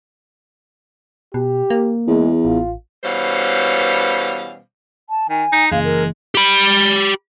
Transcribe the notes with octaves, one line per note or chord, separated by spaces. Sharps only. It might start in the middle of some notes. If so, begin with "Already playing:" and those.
B2 G4
A#3
E2 G#3
A1 F4
B2 E3 G3 C#4 C5 F5
A5
D#3 G#5
D#4
F#1 E3 G#3 F5
A#4
G4 B5